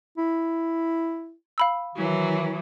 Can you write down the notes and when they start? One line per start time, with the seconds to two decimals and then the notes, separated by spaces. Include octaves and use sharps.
0.17 E4
1.58 F5 B5 E6
1.95 D#3 E3 F#3